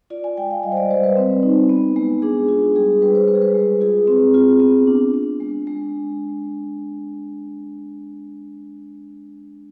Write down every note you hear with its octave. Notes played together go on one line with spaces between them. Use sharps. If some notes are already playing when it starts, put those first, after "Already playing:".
F4 D5
G#5
G#3 G5
F5
G3 D#5
C5
D5
G3 C5
B4
C4
D#4
B3
G#3
D4 G#4
F4
G3 G#4
G3 B4
C5
G#3 B4
G#4
B4
G#3
F4 G#4
C4
F4
B3
D4
D4
G#3
G#3